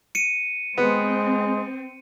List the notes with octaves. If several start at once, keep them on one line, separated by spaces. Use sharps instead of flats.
C#7 D#7
G#3 B3 C4